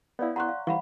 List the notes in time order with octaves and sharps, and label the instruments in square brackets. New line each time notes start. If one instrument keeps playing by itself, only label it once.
[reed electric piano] B3 E4 [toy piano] C#5 D5 F5
[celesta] F#5 C6 F#6 [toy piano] A#5 C#6
[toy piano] F5
[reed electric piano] E3 G3 C5 [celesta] F5 F#5 B5 [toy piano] C#6